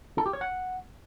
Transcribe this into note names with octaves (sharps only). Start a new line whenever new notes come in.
A4
G4
C#5
F#5